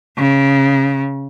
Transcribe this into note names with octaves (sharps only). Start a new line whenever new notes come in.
C#3